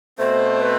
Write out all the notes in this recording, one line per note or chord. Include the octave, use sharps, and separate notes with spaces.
B2 A3 C4 C5
B4